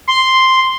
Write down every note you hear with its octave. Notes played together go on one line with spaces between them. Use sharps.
C6